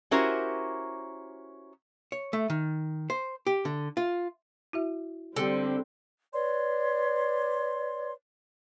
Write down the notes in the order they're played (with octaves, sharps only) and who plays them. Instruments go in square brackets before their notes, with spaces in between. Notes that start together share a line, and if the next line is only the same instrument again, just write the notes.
[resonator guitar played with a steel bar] C#4 E4 F#4 G4 A#4 C5
[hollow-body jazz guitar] C#5
A3
D#3
C5
G4
D3
F4
[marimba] E4 F#4 E5
[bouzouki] D3 [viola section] G3 C4
[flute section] B4 C#5 D5 C6